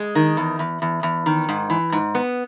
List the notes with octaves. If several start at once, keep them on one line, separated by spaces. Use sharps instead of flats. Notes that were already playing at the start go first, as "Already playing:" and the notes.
Already playing: G#3
D#3
E2
E2
E2
E2
D#3
G#2
E3
G#2
B3